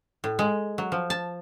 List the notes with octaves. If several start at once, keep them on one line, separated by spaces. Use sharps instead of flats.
A2
G#3
F#3
F3
A5